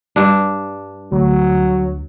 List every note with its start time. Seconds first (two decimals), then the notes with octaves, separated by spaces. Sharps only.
0.16 G2 D4
1.12 D2 F#3